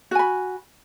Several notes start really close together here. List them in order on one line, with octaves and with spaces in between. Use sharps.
F#4 G#5 B5